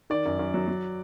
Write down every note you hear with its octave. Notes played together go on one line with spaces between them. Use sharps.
D#3 D5
F#2
F#2
F#3
F#3